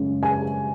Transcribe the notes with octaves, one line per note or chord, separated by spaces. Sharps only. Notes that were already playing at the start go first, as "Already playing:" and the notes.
Already playing: F#2 C#3 G#3
G#5